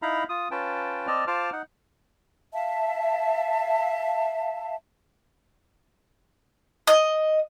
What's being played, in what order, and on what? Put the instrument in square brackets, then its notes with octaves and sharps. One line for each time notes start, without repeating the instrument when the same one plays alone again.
[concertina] D#4 E4 F5 A#5 B5
F4 D#6
C#4 F4 B4 G5 A5
C4 D5 D#5 A5 F6
F4 C5 A5 D6 F6
D#4 F#5
[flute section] E5 F5 A5
[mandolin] D#5